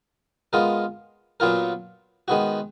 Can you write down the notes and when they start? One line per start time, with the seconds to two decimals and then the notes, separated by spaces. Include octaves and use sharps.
0.53 G#3 B3 F4 A#4
1.40 A#2 F#3 B3 F4 A#4
2.28 D#3 G#3 B3 F#4